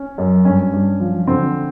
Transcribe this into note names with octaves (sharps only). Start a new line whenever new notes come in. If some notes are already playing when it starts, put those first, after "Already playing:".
Already playing: C#4
F#2
G2 C#4
G2
F3
D3 C4